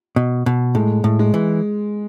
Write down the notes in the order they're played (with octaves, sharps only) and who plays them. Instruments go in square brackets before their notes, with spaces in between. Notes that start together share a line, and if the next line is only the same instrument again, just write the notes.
[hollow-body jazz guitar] B2
B2
[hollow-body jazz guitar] A2 [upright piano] G#3
[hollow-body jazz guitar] A2
[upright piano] G#3
[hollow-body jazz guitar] E3